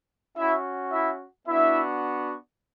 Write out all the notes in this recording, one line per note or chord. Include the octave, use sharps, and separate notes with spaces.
C#4 E4 F#4 E5
E4 E5
B3 D4 E4 F#4 E5